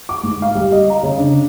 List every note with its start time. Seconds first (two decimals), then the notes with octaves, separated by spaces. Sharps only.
0.09 D6
0.23 G#2
0.42 F5
0.55 G3
0.72 D#5
0.90 A#5
1.03 C#3
1.18 D4